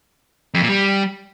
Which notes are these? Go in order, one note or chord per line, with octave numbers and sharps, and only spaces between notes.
F2
A#2
G3